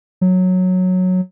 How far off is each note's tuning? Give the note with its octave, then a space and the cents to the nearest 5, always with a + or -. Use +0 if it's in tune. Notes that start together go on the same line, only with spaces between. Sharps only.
F#3 -10